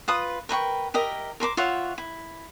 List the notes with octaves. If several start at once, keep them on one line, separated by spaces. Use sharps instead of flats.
F4 B4 D#6
A#4 B4 G5 C#6
G4 A#4 D#5 E5
A#4 C5 B5 D6
F4 C#5 E5 F#5
E4